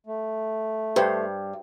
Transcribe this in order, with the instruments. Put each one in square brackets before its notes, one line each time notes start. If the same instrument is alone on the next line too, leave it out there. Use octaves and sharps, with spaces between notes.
[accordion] A3
[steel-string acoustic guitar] G2 [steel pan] G4 B4 C5